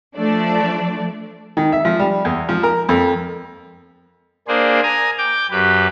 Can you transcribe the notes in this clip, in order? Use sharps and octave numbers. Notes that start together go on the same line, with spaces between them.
F3 A3 D4 D5
D#3
E5
F3
G3
E2
F3
A#4
F2
A#3 D4 G#4 C5
G#5 A#5 D#6
G5 D6 G6
F#2 G4 B4